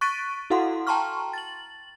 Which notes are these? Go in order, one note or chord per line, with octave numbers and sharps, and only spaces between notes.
C#6 F#6 A6 B6 D7 D#7
E4 F#4 A4 F5 F#5 C6
G5 A5 A#5 C6 C#6 F6
A6 F#7